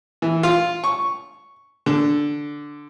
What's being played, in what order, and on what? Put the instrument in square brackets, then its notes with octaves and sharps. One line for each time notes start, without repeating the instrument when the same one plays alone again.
[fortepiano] E3
F4
C#6
D3